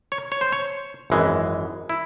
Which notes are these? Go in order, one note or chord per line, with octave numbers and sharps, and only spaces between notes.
C#5
C#5
C5
C#5
G#1 F#2 E3 G#3
E4